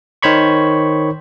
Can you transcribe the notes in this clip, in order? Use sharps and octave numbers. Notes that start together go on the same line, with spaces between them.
D#3 C5 C#5 B5 C#6